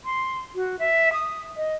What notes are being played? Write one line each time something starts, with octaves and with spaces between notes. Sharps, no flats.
C6
F#4
E5
D#6
D#5